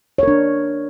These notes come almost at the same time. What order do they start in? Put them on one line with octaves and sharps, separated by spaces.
C#5 A#4 D4